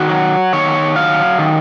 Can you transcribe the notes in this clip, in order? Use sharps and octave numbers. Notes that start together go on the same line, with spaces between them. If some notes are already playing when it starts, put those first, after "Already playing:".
Already playing: D#3 F#4
F#3
D#3 C#5
F#3 F5
D#3